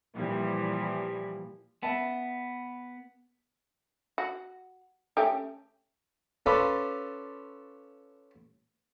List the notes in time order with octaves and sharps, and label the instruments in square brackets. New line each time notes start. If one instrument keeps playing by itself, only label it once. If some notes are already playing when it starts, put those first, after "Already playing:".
[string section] A#2 E3 F3 G3
[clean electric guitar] B3 [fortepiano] E5 A5
[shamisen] F#4
A3 C#4 G4
[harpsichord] C#4 F4 A4 B4 D5